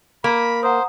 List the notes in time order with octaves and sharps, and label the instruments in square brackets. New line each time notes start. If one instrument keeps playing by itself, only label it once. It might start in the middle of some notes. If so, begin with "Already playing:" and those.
[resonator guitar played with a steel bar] A#3 [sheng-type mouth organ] B5
[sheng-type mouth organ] C5 [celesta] F#5 A#5 D#6